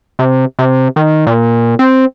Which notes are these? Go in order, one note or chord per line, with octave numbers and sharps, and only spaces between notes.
C3
C3
D#3
A#2
C4